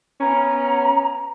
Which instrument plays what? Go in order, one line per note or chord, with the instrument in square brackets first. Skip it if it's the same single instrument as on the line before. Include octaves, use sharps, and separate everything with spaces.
[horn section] B3 C#4 [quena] A#5